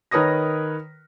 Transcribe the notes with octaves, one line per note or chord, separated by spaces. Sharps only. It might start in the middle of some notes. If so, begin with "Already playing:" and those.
D#3 A#4 B4 C#5 D#6 A#6